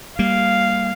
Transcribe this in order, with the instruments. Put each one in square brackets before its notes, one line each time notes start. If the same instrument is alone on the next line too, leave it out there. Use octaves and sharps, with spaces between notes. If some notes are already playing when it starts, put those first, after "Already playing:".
[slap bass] G3 A#3 [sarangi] F5